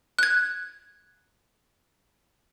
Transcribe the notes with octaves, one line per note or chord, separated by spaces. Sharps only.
F#6 G#6